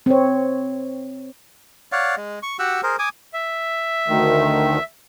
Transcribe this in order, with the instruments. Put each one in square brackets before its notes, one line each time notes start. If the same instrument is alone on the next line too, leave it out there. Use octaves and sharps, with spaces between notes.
[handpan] C4 C#5
[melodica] C#5 D5 F5 F#5
G#3
C#6
F#4 G4 F#5 E6
G#4 A#4 C5
G#5 D6 D#6
[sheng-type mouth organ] E5
[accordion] D2 D#3